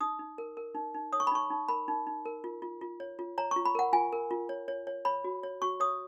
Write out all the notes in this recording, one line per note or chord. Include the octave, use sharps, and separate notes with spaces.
D#4 D#6
D#4
A#4
A#4
D#4
D#4
C#5 D#6
C#6
B5
D#4 C#6
D#4
A#4 B5
D#4
D#4
A#4
F4
F4
F4
C#5
F4
C#5 A#5
C#6
F4
B5
A#4 F#5
F4 G#5
A#4
F4
C#5
C#5
C#5
C#5 B5
F#4
C#5
F#4 C#6
C#5 D#6